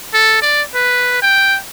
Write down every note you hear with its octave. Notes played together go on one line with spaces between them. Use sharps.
A4
D5
B4
G5